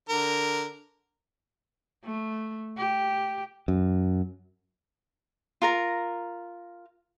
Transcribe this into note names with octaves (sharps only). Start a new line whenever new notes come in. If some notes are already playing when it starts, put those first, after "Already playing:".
D3 A#4
A3
G4
F#2
F4 A#4 A#5